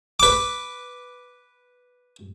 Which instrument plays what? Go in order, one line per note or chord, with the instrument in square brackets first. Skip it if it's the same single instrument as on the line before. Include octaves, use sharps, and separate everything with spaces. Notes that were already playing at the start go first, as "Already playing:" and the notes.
[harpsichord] B4 D6